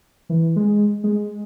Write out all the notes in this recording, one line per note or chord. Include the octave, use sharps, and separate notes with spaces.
E3
G#3
G#3